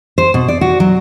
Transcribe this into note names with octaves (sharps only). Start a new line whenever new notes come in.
C5
B2
D5
F#4
F#3